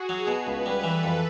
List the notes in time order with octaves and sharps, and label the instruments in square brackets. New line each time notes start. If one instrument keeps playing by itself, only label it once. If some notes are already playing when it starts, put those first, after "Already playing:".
Already playing: [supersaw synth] F#4 G#4
[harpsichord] F#3
[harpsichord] B2 [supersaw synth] B4
[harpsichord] C#2
G3
[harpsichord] E3 [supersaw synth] A4
[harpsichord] F2